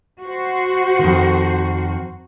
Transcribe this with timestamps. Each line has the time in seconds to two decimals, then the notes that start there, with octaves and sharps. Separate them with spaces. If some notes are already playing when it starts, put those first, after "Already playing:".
0.21 F#4 C5
0.99 F2 D#3